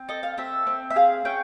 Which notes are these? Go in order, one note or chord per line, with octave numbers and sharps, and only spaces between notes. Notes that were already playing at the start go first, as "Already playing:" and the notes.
Already playing: C4
A4 D#5
F5
C4 E5
C4
E5
G#4 F5
C#4 G5